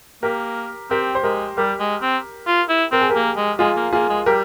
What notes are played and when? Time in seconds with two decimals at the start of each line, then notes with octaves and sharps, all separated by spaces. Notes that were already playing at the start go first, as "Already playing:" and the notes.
0.23 A#3 G4 A#4
0.91 C4 G4 A#4
1.15 C5
1.23 G#3 G4 A#4
1.57 G3 G4 A#4
1.80 G#3
2.02 C4
2.47 F4
2.69 E4
2.92 C4 A#4
3.01 G#4
3.10 G4 A#4
3.15 A#3
3.37 G#3
3.59 G#3 F4 G#4
3.76 A#3
3.93 A#3 F4 G#4
4.10 G#3
4.26 G3 G4 A#4